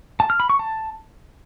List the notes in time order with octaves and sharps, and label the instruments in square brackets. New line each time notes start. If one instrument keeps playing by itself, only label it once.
[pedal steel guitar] A5
F6
B5
C#6
A5